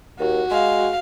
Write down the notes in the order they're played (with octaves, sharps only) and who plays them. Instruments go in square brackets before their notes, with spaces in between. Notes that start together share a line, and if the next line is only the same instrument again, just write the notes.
[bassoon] D#2 [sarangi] F#4
[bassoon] G#3 [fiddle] F5